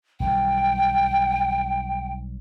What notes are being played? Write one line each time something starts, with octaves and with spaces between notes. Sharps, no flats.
B1 D#3 G3 G5